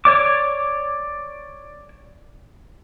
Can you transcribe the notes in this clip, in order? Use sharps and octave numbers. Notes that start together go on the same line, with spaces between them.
C#5 D5 D6